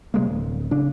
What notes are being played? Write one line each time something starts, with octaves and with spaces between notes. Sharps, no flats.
C3 G3 G#3 A#3
D1
C#3 D4